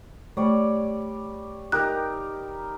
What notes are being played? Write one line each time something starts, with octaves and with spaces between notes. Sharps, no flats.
G3 A3 C#5 D5
D#4 G4 A#4 F#6